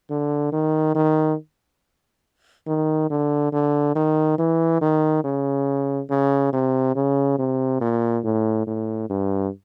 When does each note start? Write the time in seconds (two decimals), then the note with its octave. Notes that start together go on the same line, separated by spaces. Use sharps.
0.10 D3
0.53 D#3
0.95 D#3
2.67 D#3
3.10 D3
3.53 D3
3.96 D#3
4.39 E3
4.81 D#3
5.24 C#3
6.10 C#3
6.53 C3
6.96 C#3
7.39 C3
7.81 A#2
8.24 A2
8.67 A2
9.10 G2